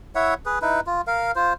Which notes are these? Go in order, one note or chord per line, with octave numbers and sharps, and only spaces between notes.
E4 C#5 E5 F#5
G#4 B4
D#4 E4 B4
F4
A#4 F5
F4 C5